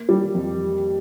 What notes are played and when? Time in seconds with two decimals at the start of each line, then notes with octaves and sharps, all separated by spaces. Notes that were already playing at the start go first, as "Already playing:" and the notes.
Already playing: A#3
0.09 G3
0.34 F2